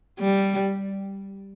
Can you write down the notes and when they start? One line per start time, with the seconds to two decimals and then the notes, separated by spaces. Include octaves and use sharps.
0.20 G3